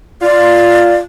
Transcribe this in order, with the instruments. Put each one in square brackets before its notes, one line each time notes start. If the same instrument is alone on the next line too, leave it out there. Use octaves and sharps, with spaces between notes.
[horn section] F4 [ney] D5